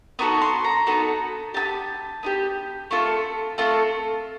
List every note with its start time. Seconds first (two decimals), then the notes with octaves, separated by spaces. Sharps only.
0.19 B3 D#4 F#4 A4 C#6
0.42 C6
0.64 A#5
0.87 B3 D#4 F#4 A4
1.54 B3 D#4 G4 A5
2.23 B3 D#4 G4
2.91 A3 C4 F4 A4
3.58 A3 C4 F4 A4